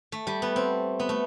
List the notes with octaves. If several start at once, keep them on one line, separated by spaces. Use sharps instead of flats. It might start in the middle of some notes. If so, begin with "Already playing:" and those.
A3
G3
B3
C4
B3
A3